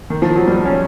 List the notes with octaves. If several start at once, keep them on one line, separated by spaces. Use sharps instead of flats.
D#3
F3
F#3
G3
C#4